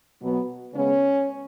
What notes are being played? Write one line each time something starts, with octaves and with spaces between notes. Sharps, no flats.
B2 F#3 B3
C#3 G#3 B3 C#4